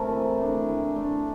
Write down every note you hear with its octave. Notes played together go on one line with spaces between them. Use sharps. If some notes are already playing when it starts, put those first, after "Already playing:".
Already playing: C3 A3 A#4
E3
A3 D4
E3
A3 D4